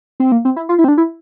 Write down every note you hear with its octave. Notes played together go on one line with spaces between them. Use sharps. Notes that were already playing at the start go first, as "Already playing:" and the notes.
C4
A#3
C4
E4
F4
E4
C4
D4
E4